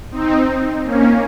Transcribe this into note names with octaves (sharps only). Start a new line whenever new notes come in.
C4 D#4
A#3 C#4